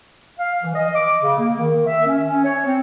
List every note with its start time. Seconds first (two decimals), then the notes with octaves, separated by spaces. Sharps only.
0.39 F5
0.63 E3
0.75 D#5
0.96 D6
1.22 C#3
1.39 A#3
1.58 D#3
1.87 E5
2.07 C#4
2.24 C#4
2.45 C#5
2.66 C4